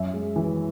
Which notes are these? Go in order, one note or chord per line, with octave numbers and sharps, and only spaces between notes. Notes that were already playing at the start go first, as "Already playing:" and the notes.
Already playing: F#2 E5
G#3
E3